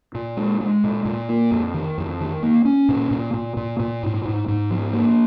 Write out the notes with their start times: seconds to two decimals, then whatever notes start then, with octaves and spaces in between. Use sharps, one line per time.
0.15 A#2
0.37 G#3
0.61 G#3
0.84 A#2
1.05 A#2
1.29 A#3
1.51 F2
1.74 D#3
1.98 F2
2.21 D#3
2.43 A#3
2.65 C#4
2.89 A#2
3.11 A#2
3.34 A#2
3.57 A#2
3.80 A#2
4.03 G#2
4.25 G#2
4.48 G#2
4.71 F3
4.93 A#3